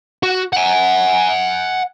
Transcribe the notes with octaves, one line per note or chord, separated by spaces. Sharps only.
F#4
F#5 G#5